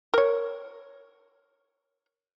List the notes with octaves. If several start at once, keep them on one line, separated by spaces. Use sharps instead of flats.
A#4 C#5